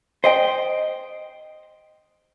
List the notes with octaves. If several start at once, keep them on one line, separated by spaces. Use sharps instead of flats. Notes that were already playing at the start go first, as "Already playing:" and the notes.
C5 D#5 G5